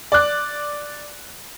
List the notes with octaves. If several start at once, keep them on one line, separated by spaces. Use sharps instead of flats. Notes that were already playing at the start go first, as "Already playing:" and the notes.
D5 D6 F#6